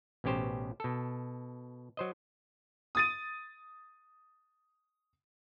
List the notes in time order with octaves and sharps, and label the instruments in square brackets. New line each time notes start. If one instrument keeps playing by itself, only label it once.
[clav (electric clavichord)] A1 B2 C#4 G4 C5
B2 A4
F#3 C5 D#5
[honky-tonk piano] D#6 A6 D#7